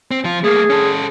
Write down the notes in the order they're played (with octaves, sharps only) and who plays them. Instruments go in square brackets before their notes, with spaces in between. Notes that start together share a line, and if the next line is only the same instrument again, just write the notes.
[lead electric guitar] C4
F3 F4
[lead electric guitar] A3 A#3 [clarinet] G#4
[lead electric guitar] C#4 A4